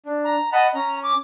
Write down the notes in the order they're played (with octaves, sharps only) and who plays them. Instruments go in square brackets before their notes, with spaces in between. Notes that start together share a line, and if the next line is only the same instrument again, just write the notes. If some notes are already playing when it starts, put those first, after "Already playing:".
[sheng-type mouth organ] D4
[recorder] A#5
[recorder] D#5 [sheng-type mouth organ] F#5 A5 B5
[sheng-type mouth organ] C#4 [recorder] A#5
[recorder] D6